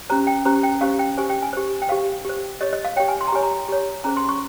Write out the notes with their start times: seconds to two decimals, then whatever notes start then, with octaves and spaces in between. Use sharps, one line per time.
0.10 C#4 G4 C5 A#5
0.27 G5
0.45 C#4 G4 C5 A#5
0.63 G5
0.81 C#4 G4 C5 F5
0.99 G5
1.18 G4 C5 G#5
1.30 G5
1.43 G#5
1.53 G4 C5
1.82 G5
1.89 G4 C5 F5
2.25 G4 C5
2.61 G4 C#5 D#5
2.73 D#5
2.84 F5
2.96 C#5 G5
3.00 G4
3.08 G#5
3.21 C6
3.28 A#5
3.32 G4 C#5 G#5
3.43 A#5
3.69 G4 C#5
4.04 C#4 G#4 C5 A#5
4.17 C6
4.29 C#6